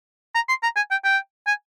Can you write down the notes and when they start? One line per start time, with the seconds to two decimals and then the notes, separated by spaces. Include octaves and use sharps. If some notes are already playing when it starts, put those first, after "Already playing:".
0.35 A#5
0.49 C6
0.63 A#5
0.76 G#5
0.91 G5
1.04 G5
1.47 G#5